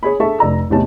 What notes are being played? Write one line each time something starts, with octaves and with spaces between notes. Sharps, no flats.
G#4 C#5 G#5 B5
G#4 A4 E5 A5 C#6
F1 D5 A#5 E6
A1 E2 C3 D#4 C#5 A5